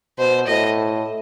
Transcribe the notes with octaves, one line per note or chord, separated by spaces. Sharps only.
B2 C5
A2 D#5